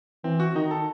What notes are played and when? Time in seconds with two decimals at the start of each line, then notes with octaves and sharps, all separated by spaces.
0.24 E3 C4
0.40 F#4
0.55 D#3 D#4
0.71 A4